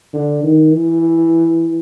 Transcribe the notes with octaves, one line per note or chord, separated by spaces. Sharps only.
D3
D#3
E3